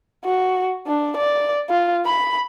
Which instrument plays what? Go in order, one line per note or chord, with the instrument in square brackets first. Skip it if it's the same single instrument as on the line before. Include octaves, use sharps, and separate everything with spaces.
[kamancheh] F#4
D4
D5
F4
B5